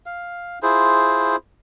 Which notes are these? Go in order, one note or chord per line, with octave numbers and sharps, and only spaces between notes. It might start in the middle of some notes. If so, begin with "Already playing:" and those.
F5
E4 F4 G#4 C5